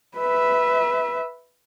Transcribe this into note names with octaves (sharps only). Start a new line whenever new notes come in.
B4 E5